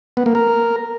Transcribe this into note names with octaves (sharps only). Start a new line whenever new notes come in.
B3
A#3
A#4